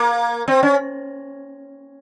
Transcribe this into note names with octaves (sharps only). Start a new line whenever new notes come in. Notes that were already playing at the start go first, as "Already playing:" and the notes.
Already playing: A#3
C4
C#4